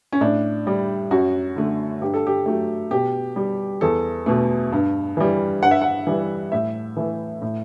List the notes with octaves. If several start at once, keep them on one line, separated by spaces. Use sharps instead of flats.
C#4
A2 D4
G3
F#2 F#4
D3 A3
G2 G4
A4
G4
F#3 A3
B2 G4
G3
E2 A4
B2 A3
G2
E3 G3
G2 F#5
E5
F#5
E3 G3
A2 E5
E3 A3
A2